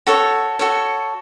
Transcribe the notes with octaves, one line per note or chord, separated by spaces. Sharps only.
F#4 A4 C#5
F#4 A4 C#5